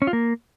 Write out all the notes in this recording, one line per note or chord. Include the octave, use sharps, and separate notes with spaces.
C#4
F4
A#3